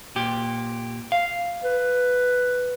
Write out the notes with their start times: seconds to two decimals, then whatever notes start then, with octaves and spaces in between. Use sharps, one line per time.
0.16 A#2 G4
1.12 F5
1.64 B4